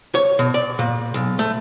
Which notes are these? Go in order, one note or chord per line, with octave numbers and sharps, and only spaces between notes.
C#5
B2
D5
A#2
B1
A3